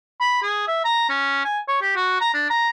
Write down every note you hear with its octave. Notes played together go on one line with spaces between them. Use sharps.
B5
G#4
E5
A#5
C#4
G#5
C#5
G4
F#4
A#5
D4
A#5